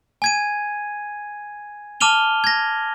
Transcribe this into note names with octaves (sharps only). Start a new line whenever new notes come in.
G#5 G#6 D#7
A5 D6 F6 D#7 F7 G7
G#6 A#6